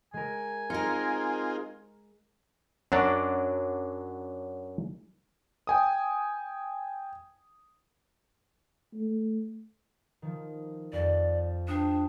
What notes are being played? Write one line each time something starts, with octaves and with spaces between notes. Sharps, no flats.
G#3 A#4 G#5
C4 D#4 F4 G#4 A#4 A#5 C#7
F#2 F#3 D4 D5
G5 G#5 D#6
A3
D#3 F3
F2 D5
D4 C5 G5 D#6